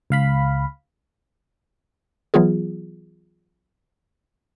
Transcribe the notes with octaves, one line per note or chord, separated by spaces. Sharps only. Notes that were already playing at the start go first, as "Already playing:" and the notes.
C#2 F5 B5
E3 F#3 B3 F4 G#4